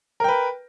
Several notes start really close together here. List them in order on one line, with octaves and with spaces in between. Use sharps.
A#4 G5 B4